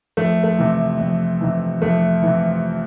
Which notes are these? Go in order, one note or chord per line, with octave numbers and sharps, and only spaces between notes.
F2 A3
A3
C3 E3
F2
C3 E3
F2 A3
C3 E3